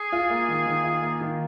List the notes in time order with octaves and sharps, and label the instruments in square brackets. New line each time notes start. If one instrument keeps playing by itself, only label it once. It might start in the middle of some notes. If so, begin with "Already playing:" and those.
Already playing: [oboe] G#4
[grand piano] F4
A#3
D#3
D#3
F4
A#3
D#3